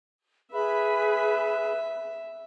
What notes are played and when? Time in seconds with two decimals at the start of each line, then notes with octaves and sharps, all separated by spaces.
0.51 G#4 B4 E5 B5